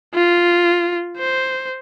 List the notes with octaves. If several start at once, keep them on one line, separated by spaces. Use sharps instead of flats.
F4
C5